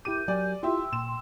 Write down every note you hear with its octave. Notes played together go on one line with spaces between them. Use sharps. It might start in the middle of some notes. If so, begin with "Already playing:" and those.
E4 G4 A#4 D6 G6 D#7
F#3 G4 D5 G#5
E4 F4 G4 E5 G5 C6 E6
A#2 E7